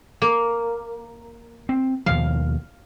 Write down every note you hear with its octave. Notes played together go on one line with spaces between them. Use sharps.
A#3
C4
D#2 B2 F3 F5